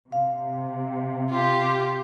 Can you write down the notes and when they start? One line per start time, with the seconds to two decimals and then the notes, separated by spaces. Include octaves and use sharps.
0.12 C3 F5
1.30 F4 G4